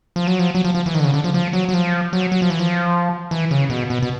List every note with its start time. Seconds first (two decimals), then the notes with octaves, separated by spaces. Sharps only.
0.16 F3
0.27 F#3
0.39 F3
0.55 F#3
0.65 F3
0.75 F3
0.86 E3
0.94 D#3
0.99 D3
1.04 C#3
1.14 D3
1.24 F3
1.34 F3
1.53 F#3
1.69 F#3
1.74 F3
2.13 F#3
2.32 F#3
2.42 F3
2.50 E3
2.59 F3
3.31 E3
3.51 C#3
3.70 B2
3.90 B2
4.03 B2